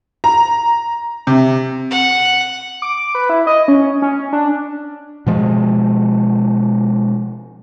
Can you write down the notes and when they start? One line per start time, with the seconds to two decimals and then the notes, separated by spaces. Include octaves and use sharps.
0.24 A#5
1.27 C3
1.91 F#5
2.82 D6
3.15 B4
3.29 E4
3.47 D#5
3.68 C#4
4.02 C#4
4.33 D4
5.27 B2 F3 G#3